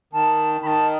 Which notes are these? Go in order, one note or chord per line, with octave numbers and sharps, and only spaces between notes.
D#3 A5
D#3 A5 B5